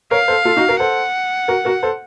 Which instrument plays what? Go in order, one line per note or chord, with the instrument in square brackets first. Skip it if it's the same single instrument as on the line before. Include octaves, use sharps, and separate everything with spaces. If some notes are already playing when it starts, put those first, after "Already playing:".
[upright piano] A#4 C#5 [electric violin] F5
[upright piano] A4 C5
F4 A4
D#4 F#4
F#4 A#4
[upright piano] A4 C5 [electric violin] F#5
[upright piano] F#4 A#4
F#4 A#4
A4 C5